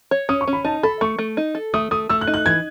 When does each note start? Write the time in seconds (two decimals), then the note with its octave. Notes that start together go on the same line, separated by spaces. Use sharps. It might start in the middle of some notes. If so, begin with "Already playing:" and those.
0.11 C#5
0.29 C#4 D#6
0.41 C#6
0.48 C#4
0.53 B5
0.65 D#4 A5
0.83 A4 B5
1.01 A3 C#6
1.19 A3
1.37 D#4
1.55 A4
1.74 A3 D#6
1.91 A3 D#6
2.09 A3 E6
2.21 F#6
2.27 D#4
2.34 F#6
2.46 E3 G#6